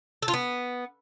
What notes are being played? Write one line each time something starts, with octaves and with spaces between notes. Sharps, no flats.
A4
F4
B3